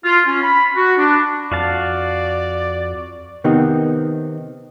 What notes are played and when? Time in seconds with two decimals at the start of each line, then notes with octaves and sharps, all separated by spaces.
0.04 F4
0.26 C#4
0.43 B5
0.76 F#4
0.97 D4
1.52 F2 F#4 D5 F5 A5
3.44 C3 D#3 B3 C4 D#4 G4